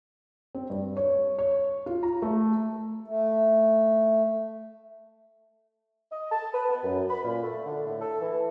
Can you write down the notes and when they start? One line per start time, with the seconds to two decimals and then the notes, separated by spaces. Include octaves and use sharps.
0.55 C4
0.70 G2
0.97 C#5
1.39 C#5
1.86 F4
2.03 A#5
2.22 A3
3.08 A3
6.12 D#5
6.31 A5
6.53 B4
6.69 B3
6.82 F#2
7.10 B5
7.23 A#2
7.42 A3
7.65 D3
7.86 A2
8.01 A4
8.21 E3